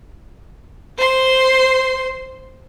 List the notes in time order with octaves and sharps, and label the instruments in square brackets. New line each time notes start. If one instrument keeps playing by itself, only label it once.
[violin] C5 C6